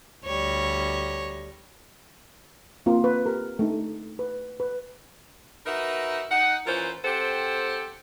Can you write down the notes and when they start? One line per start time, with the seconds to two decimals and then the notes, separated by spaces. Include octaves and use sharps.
0.25 D2 G3 C#5 A#6
2.86 A#3 C4 F4
3.04 B4
3.26 G4 A#4
3.59 A3 D4 D#4
4.19 B4
4.60 B4
5.66 D#4 F#4 A#4 B4 E5
6.32 D#4 F#5
6.67 E3 C#4 F4 A#4 C5
7.05 C4 G4 A4 C5 F#5